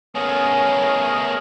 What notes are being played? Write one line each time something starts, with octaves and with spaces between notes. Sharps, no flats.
A3 B3 C#4 G#4 A#4 D#5